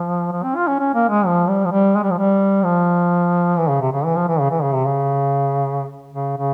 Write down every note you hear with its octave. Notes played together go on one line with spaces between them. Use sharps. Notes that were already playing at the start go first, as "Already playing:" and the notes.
Already playing: F3
F3
C4
F4
C#4
C#4
A#3
G#3
F3
G3
F3
G3
G#3
G3
F3
G3
F3
E3
C#3
C3
C#3
E3
F3
E3
C#3
E3
C#3
C3
C#3
C#3
C#3